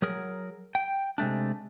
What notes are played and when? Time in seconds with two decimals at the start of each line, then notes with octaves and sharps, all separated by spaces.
0.02 F#3 G#4 A#4
0.75 G5
1.18 C3 G#3 A3 D4